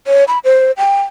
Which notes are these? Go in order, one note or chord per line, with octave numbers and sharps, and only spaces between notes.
C#5
B5
C5
G5